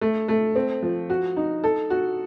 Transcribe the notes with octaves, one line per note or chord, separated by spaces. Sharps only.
A3
A3
C4
F3
F#4
D#4
A4
F#4